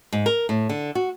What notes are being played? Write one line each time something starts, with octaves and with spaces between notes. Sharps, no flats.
G#2
A#4
A2
D3
F#4